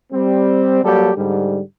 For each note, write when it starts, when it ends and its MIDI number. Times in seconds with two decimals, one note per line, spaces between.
0.12 0.81 55
0.12 0.81 60
0.84 1.11 54
0.84 1.11 55
0.84 1.11 58
0.84 1.11 67
0.84 1.11 69
1.16 1.60 44
1.16 1.60 50
1.16 1.60 55